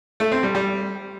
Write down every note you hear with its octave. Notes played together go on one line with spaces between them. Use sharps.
A3
C4
G3
G3